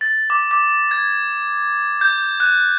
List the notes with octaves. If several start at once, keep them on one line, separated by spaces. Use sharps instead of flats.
A6
D6
D6
G#6
G6
F#6